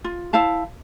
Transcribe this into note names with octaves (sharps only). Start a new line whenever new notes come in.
F4
E4 C5 F5 A5